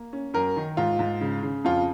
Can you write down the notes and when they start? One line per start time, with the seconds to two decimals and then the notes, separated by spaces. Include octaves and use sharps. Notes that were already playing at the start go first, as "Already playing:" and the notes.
Already playing: A#3
0.13 C#4
0.34 F#2 A#4
0.56 D#3
0.77 G#2 F4
0.99 G#2
1.21 C#3
1.43 C#3
1.65 F2 F4